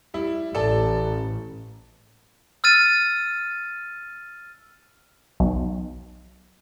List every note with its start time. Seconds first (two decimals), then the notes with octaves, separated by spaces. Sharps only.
0.14 G3 E4
0.55 A1 A4 D5 A5
2.64 E6 F6 A6 D#7
5.40 B1